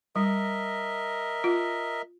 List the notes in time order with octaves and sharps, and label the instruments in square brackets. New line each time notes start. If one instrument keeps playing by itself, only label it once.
[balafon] G3 [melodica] A#4 D#5 E5
[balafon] F4